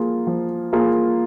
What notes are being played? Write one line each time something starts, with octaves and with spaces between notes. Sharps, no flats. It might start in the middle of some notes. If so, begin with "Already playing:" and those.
Already playing: F3 A#3 F4 G#4
F3
A#3 F4 G#4